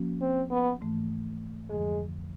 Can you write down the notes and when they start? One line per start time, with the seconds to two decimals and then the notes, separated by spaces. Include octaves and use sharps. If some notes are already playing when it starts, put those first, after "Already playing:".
Already playing: F3 A#3 C#4 F#4
0.21 C4
0.51 B3
0.81 G#2 E3 A3
1.69 F2 D3 F3 G#3